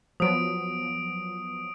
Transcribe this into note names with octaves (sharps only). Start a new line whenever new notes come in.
F3 F#3 B3 D#6 D7